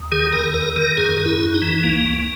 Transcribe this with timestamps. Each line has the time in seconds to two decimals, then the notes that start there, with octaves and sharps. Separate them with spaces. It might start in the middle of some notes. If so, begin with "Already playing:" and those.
Already playing: D#2
0.12 D#3 G#4
0.32 E2 A#4
0.54 E2 A#4
0.76 D#3 A#4
0.97 F#2 G#4
1.19 F#2
1.25 E4
1.40 F#2
1.54 D#4
1.62 E3
1.83 C#2 A#3
2.04 C#2